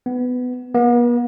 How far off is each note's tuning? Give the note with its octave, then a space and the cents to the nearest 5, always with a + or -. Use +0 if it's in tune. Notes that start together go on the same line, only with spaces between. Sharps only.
B3 +15
B3 -45